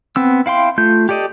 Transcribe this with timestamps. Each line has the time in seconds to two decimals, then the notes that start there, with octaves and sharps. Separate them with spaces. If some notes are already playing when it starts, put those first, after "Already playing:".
0.16 B3 C4 E6
0.46 E4 F5 G5 C6
0.78 A3 F4 G6
1.09 G4 A4 D5 D#5